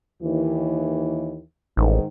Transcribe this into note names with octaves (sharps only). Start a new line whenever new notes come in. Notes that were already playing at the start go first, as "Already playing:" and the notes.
D#2 E3
A1 G#2 D#3